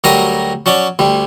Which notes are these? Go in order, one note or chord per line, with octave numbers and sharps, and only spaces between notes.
D2 F#3 G3 A#4 A#5 D#6
F#3 C#4 D5
D2 G3